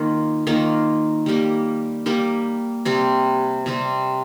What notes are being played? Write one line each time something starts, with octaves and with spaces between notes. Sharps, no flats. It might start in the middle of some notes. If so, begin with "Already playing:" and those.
Already playing: D#3 A#3 F4
D#3 A#3 F4
G3 A#3 G4
G3 A#3 G4
C3 G3 C4
C3 G3 C4